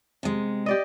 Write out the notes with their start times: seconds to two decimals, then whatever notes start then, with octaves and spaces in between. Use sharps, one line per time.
0.23 C3 G#3
0.66 G4 D5 D#5